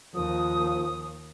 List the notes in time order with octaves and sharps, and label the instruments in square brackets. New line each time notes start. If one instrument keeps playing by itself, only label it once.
[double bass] D#2 [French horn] F3 [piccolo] D#6